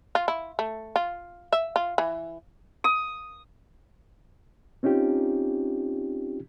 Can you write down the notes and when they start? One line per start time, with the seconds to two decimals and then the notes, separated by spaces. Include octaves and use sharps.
0.15 F4
0.28 E4
0.59 A3
0.96 F4
1.52 E5
1.76 F4
1.98 E3
2.84 D#6
4.83 C4 C#4 D#4 F4 G4